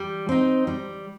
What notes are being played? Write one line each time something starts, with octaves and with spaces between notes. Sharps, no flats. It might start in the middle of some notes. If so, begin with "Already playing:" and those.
Already playing: G3
C4 D#4
G3